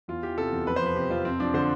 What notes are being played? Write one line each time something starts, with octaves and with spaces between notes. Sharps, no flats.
E2 F4
E3 G4
C3 A4
E2
F2 B4
C5
F3 B4
C3 G4
F2 F4
F2 C4
F3 D4
D3 C5